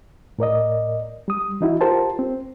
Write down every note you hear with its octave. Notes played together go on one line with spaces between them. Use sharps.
A2 A#4 D5 D#5
G3 D#6
E3 D#4 E4 F#4
F4 G4 A#4 C5 A5
C4